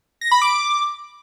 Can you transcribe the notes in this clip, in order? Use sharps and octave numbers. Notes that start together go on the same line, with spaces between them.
A#6
B5
D6